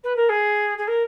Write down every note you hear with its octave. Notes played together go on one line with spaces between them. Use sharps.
B4
A#4
G#4
G#4
A#4